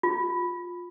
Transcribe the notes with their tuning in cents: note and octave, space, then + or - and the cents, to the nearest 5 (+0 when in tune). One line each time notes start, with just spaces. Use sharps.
F4 +15